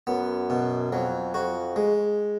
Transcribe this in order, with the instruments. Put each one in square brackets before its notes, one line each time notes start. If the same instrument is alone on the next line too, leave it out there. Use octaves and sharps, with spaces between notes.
[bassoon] F#2 [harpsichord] B3
[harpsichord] B2
[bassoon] F2 [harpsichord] F#3
[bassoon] F2 [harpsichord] F#4
[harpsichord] G#3